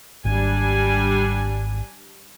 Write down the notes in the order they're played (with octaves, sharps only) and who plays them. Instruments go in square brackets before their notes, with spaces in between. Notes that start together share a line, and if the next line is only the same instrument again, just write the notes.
[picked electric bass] G#1 [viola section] G3 D4 G#5